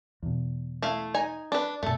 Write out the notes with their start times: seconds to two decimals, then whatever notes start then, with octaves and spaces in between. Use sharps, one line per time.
0.22 E2 B2
0.82 A3 E4 F5
1.14 D#4 G#5
1.52 D4 B4
1.83 F#2 B2 A3 A4